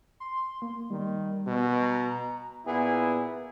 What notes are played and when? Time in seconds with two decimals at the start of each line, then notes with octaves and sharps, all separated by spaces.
0.20 C6
0.62 A#3
0.91 D#3 G3
1.47 B2
1.82 A#5
2.65 A#2 B3 E4 G#4